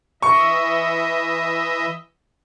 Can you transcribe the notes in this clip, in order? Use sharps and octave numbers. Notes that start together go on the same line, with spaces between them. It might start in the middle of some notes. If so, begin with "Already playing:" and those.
E3 D#5 E5 C#6